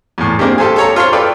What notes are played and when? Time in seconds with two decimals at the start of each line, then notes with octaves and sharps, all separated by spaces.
0.18 E2 A2
0.39 G#3 A#3 C4 D4 D#4 G4
0.58 G4 A4 C5 F5 G#5
0.76 A4 C#5 A#5
0.96 F4 C5 C#5 F5
1.13 A4 B4 D5 G5